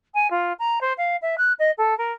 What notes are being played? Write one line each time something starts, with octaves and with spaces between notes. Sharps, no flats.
G#5
F4
A#5
C5
F5
E5
F#6
D#5
A4
A#4